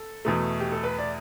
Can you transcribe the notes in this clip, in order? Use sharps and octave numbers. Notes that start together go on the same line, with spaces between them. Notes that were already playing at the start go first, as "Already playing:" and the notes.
Already playing: A4
E2 B2 A3
G4
A4
B4
D5